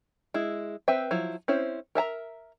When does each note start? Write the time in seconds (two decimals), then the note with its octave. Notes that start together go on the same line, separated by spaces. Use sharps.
0.34 G#3 E4
0.88 C4 B4 E5 G5
1.11 F3 F#3 E4
1.48 C4 C#4 E4 C5
1.95 A#4 E5 A5 A#5